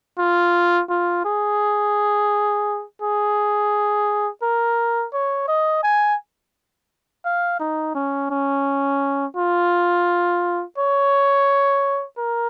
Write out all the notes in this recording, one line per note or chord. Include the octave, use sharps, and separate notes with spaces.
F4
F4
G#4
G#4
A#4
C#5
D#5
G#5
F5
D#4
C#4
C#4
F4
C#5
A#4